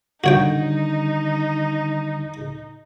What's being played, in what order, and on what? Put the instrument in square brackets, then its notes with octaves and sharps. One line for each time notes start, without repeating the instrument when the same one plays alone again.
[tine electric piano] D3 D#3 G3 [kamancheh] D#4 [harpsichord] F#4 C#5 G5